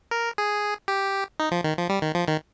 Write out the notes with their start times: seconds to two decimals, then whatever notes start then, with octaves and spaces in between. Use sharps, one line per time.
0.11 A#4
0.38 G#4
0.88 G4
1.40 D#4
1.51 F3
1.64 D#3
1.78 F3
1.89 G3
2.02 D#3
2.15 F3
2.28 D#3